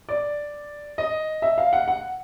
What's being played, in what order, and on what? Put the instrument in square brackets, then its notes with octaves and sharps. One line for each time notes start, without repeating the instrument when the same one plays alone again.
[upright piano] D5
D#5
E5
F5
F#5
F#5